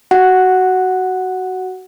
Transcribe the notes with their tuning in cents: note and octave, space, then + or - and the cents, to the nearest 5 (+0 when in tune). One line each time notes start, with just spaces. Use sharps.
F#4 +15 F#5 +0